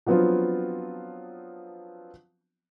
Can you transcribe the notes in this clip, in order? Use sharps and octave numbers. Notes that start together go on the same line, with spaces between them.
F3 F#3 B3 C4 D4 F4